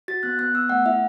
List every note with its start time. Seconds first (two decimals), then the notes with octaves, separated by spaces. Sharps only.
0.08 F#4 A6
0.23 B3 F#6
0.39 B3 F#6
0.54 B3 E6
0.69 A3 F#5
0.86 E4 E5